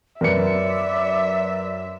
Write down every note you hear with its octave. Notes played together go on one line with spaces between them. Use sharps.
F#2 A#4 B4 D5 E5 C#7